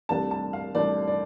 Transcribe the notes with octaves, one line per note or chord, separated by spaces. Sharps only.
C2 C3 A3 D4 A5
A5
F5
C2 C3 A3 D4 D5
D5